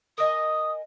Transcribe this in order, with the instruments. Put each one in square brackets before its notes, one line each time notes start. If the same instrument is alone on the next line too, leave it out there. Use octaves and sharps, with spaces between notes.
[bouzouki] A#4 D#5 G#5 [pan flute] D#6